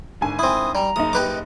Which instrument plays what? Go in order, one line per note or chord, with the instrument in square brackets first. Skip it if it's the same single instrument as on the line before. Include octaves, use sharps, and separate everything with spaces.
[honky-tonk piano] G#1 D3 G#5
[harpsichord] C4 E4 [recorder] D#6
[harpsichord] G3 [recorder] A#5
[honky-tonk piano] F#1 D#4 [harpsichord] D#6
[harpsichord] G4 B4 D6